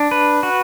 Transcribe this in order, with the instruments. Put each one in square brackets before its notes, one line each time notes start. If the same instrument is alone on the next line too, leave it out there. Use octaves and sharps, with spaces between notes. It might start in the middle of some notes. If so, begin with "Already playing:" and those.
Already playing: [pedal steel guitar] D4
B4
F#4